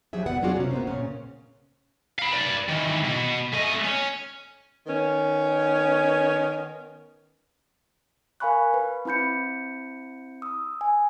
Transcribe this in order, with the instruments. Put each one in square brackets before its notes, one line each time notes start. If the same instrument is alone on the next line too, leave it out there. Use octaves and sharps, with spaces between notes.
[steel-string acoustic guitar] F3 F#3 G4 G#4 E5
F2 G3 B3 B4 D5 F#5
F#3 D4 F4 F#4 G#4 D5
C3 C#4
A#3 B3 C5
A#2 C#3 C#4
[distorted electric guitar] F5 B5
B4 D5
D#3 E3
B2
A3 D#5
C#4
[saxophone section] D#3 B3 C#4
[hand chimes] A#4 F5 G#5 B5 C#6 F#6
B4
C4 E4 B5 G6 C#7
D#6 E6
G#5